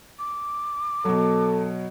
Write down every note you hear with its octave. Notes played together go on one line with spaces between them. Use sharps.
D6
B2 F#3 A4